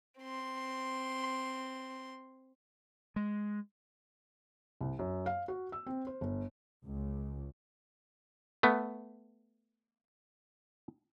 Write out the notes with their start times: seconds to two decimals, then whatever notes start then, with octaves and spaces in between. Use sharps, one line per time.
0.19 C4 C6
3.16 G#3
4.81 C2
4.99 F#2
5.26 F5
5.48 F#4
5.72 E6
5.87 C4
6.07 C5
6.21 G1
6.85 C#2
8.63 A3 B3